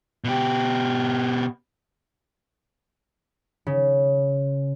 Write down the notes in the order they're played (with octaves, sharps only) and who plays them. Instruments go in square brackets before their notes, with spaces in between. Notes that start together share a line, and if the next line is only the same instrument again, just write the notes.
[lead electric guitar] B2 G4
[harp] C#3